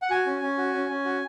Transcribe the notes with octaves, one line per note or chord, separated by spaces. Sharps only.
F#5
F#4 G#5
C#4
C#4
F#4
C#4
C#4
F#4